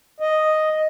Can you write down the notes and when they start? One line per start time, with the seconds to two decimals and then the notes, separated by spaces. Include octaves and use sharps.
0.20 D#5